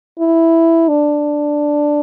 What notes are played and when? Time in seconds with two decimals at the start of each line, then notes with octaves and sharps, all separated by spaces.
0.19 E4
0.89 D4